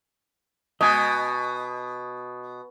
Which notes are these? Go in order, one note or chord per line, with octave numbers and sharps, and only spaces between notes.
B2 D#5 G#5